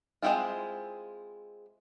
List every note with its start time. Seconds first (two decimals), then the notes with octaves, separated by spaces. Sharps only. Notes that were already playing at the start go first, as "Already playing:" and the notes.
0.22 G#3 A3 C4 E4 F4